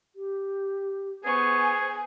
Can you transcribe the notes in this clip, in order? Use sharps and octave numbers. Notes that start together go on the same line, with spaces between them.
G4
B3 G#4 C5 G#5 C#6